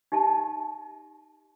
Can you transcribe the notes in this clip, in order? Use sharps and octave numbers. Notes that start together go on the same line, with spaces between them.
D#4 G4 E5 A5